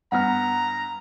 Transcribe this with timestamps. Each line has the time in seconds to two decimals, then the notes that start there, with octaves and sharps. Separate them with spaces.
0.12 G2 B3 F#5 A#5 F6